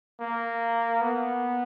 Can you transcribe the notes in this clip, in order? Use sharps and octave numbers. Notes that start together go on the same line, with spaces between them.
A#3
B3